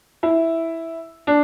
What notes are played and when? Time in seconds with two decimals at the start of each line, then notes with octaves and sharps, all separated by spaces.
0.23 E4
1.27 D4